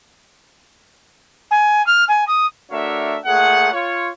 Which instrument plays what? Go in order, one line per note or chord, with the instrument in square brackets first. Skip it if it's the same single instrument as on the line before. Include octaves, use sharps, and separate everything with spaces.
[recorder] G#5
F6
G#5
D#6
[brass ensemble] A3 D4 F#4 A#4 C#5 E5
A#2 A3 G#4 F#5
F4 C#5